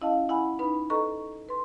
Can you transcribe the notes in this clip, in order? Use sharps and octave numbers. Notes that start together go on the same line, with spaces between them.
C#4 E4 D#5 F5 A5
E4 F#5 G#5 B5
D#4 B4 B5
A4 B4 D#5 A#5 C#6
B4 C6